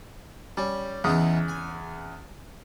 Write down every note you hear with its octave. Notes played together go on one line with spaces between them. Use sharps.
G3 C#4
E2 C#3 E3 B3 D#4 D#6
G#5